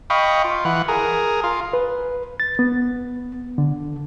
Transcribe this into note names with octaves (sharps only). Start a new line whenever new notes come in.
D#5 F5 G5 B5 C#6
F4
E3 F#5
G#4 A#4
F4
B4
A6
B3
D3